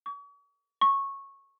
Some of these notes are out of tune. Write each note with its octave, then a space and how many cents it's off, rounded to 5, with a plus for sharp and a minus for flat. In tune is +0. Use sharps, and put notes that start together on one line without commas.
C#6 +40
C#6 -10